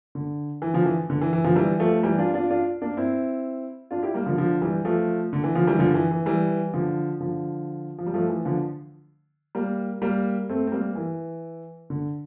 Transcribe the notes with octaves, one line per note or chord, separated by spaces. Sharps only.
D3
E3
D3 F3
E3
D3
E3
E3
D3 F3
E3 G3
F3 A3
E3 G3
D4 F4
D4 F4
D4 F4
A#3 D4
C4 E4
D4 F4
E4 G4
G3 A#3
D3 F3
D3 F3
E3 G3
F3 A3
D3
E3
D3 F3
E3 G3
D3 F3
E3
E3
E3 G3
D3 F3
D3 F3
F3
G3
F3 A3
E3
D3 F3
G3 A#3
G3 A#3
A3 C4
C4
G3 A#3
E3
D3